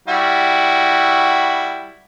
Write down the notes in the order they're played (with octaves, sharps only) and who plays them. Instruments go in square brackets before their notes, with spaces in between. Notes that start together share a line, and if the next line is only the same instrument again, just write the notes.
[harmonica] G3 E4 F#4